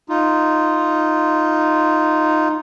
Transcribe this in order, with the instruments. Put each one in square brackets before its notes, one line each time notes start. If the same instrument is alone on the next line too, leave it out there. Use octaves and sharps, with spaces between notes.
[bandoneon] D#4 F4